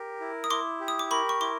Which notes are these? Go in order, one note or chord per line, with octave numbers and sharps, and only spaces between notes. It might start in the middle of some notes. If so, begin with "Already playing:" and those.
Already playing: G4 A#4
E4
D#6
E4 C6 D6
G4
D#6
D6
A#4 B5 C#6
C#6
E4 C6 D6